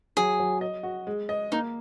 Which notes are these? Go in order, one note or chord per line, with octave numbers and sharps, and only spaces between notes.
F#3 G#4
F#3
D#5
F#4
G#3
D#5
A#3 D#4